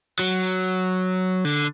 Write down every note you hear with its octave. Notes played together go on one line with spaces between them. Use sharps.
F#3
D3